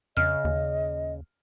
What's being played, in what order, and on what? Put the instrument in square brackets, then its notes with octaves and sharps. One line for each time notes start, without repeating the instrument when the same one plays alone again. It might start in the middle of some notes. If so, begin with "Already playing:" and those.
[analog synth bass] F2 [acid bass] C#3 [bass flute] D#5 [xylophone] F6
[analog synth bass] D#2